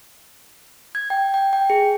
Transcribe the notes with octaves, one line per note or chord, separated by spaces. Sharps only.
G#6
G5
G5
G5
G#4